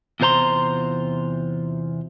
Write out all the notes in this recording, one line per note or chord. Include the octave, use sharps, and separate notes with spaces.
E2 C3 F4 C5 A#5 C6